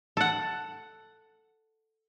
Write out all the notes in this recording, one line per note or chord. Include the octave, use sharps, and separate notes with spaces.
A4 F#5